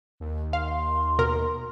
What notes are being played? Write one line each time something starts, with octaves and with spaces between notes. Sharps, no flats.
D#2
F5 C6
B2 A#4